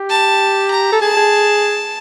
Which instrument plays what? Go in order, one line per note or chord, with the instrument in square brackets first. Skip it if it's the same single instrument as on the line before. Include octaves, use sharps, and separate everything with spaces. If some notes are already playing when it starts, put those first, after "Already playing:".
Already playing: [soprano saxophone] G4
[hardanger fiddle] A5
A#5
[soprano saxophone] A4
[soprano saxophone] G#4 [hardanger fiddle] A5
[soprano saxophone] G#4